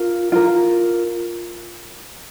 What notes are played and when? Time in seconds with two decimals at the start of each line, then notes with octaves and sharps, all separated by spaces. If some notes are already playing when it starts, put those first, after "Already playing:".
Already playing: F4 A#4
0.32 F4 A#4